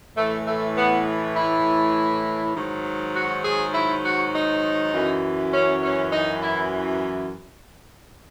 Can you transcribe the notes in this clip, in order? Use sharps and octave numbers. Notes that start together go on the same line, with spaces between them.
A2 E3 A3
A3
B3
E4
G#2 D#3 F#3
F#4
G#4
E4
F#4
D#4
F#2 E3
C#4
C#4
D#4
E4